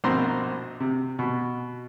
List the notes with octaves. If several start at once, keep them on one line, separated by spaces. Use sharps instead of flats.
A#1 B2 C4 A#5 C6
C3
B2